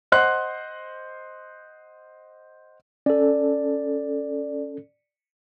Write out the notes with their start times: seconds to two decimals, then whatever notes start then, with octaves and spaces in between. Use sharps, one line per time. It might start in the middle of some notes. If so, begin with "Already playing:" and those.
0.12 C5 D#5 F#5 C6 F#6
3.06 C#4 A4 D5